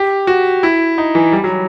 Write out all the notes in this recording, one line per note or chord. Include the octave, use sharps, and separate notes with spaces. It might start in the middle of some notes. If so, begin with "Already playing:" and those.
Already playing: G4
F#4
E4
D#4
E3
G3
F#3